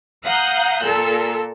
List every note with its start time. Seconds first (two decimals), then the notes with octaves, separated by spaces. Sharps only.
0.24 F5 F#5 A#5 D#6 F#6 G6
0.83 A#2 A4 E6